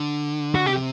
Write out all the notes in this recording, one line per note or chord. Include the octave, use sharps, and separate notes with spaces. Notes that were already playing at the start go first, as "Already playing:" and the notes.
Already playing: D3
F#4
C3 G4